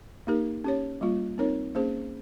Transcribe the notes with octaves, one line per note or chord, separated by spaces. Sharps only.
A#3 D#4 G4 A#4
C#4 G4 C#5
G3 A#3 F4
C4 D#4 A#4 C#5
A#3 C#4 G#4 C5